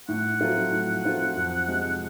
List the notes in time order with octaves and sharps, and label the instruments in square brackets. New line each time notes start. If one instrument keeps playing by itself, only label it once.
[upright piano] A2 [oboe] F#5
[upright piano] F#3 A3 C4 F4
A2
F#3 A3 C4 F4
F2
C3 F3 G#3